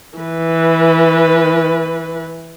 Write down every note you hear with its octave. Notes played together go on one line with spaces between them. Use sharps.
E3 B4